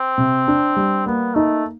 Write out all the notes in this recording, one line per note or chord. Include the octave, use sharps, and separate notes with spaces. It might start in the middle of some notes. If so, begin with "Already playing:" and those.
Already playing: C4
C3
D4
G3
A#3 B3
A3 D#4